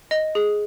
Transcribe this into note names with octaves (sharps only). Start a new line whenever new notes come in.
D#5
G#4